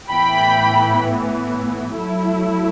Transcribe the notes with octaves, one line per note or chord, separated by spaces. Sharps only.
A2 E3 B3 G5 B5
F#3 A3 E4